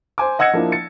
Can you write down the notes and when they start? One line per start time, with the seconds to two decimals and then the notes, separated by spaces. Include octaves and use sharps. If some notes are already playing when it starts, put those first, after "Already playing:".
0.18 C5 G#5 D6
0.39 D#5 F#5 E6 G#6 A#6 C#7
0.53 F3 A#3 D4 E4
0.72 A6 C#7